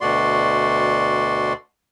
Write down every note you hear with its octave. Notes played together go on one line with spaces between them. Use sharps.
D2 B2 A3 F#4 D5 C6